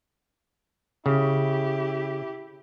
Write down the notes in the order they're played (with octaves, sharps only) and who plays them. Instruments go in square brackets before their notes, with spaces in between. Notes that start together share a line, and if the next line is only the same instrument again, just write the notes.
[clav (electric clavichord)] C#3 [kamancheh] E4 G4